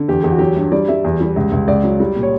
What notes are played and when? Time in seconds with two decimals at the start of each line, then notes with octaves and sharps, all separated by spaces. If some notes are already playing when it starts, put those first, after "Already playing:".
Already playing: D3
0.08 E2 G4
0.24 E2 G4
0.32 F#4
0.39 F#3 G4
0.57 G2
0.72 G3 D5
0.88 G3 E5
1.04 E2
1.21 G3
1.36 C#2
1.52 C#2
1.68 C#2 D5
1.84 F#3
2.00 G3
2.16 A#2
2.23 C#5